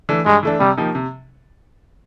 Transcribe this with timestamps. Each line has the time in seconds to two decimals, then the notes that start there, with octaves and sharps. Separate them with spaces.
0.09 E3 A3 D4
0.26 G2 G#3
0.43 E3 A3 D4
0.60 C3 G3
0.77 F3 A#3 D#4 G4
0.95 C3